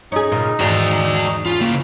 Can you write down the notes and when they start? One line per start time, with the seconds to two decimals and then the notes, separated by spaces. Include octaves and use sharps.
0.12 C#4 D#4 G#4
0.32 A#2 C#3
0.60 E2 G#2 F#4 D5
1.46 C#4 F4 B5
1.61 C#3 A#3